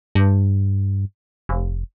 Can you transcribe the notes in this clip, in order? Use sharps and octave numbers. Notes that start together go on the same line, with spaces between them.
G2
F1